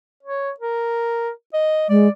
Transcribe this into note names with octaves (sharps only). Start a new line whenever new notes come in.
C#5
A#4
D#5
G#3 D5